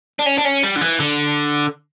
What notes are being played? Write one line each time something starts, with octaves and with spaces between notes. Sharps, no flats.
D4
C#4
D4
C#4
G3
D3
E3
D3